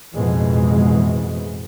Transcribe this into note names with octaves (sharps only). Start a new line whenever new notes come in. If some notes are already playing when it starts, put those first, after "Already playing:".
A1 F2 B2 E3 G#3